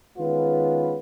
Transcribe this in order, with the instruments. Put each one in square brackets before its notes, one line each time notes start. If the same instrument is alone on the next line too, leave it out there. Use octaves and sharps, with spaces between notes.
[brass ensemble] D#3 G#3 B3 C#4 F4 B4